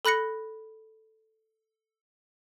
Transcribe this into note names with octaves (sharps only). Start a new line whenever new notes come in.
A4 B5 F#6 A#6 C#7